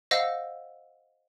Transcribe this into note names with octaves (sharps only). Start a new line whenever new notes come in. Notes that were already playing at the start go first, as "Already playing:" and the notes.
C5 D#5 F5 F#5 E6 A#6